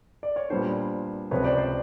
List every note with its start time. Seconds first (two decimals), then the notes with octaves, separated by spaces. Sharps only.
0.23 D5
0.36 C#5
0.50 A#2 G3 B3 D4 A#4 C5
1.31 C#2 C3 F3 B4 C#5
1.44 C5 D5
1.58 C5 D5